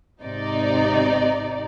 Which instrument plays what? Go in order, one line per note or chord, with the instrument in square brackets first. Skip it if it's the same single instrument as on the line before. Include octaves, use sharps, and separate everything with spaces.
[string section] G#1 C3 D#4 D5